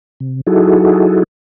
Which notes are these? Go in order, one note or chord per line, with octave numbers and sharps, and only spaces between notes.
C3
F#3 D#4 E4 F#4 G#4 A4